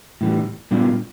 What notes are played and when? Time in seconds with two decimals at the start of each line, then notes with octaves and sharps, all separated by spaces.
0.21 A2 E3 G3
0.71 A#2 G3 B3 D4 F4